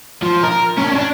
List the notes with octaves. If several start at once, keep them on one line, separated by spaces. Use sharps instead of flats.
F3
A#4
C#4 D4
D4